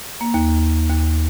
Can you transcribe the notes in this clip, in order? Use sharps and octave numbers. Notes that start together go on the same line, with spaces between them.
A#3
D#2
D#2